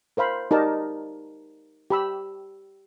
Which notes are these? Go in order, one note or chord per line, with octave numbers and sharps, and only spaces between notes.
A#4 C5 F5 B5
D#4 G4 A#4 D5 A5
G4 B5 E6